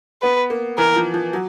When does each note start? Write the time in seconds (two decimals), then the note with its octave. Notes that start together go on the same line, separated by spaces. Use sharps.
0.22 B3 B4
0.50 A#3
0.78 E3 A#4
0.96 F3
1.14 F3
1.33 F#3